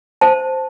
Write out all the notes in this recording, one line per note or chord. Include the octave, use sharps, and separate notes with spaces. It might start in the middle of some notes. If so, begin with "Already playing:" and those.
C5 A5